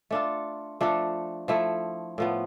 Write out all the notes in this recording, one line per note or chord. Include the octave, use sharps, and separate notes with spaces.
A3 D4 F4 A4
F3 A3 D4 A4
F3 A3 E4
A2 F3 B3